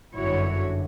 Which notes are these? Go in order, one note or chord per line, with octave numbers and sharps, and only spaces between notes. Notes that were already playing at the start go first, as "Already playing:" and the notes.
G1 F#2 D3 E4 F#4 C#5